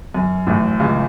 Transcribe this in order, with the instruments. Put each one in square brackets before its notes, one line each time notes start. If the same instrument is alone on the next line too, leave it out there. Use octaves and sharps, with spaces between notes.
[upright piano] F#2
A1 A2
C#2 C#3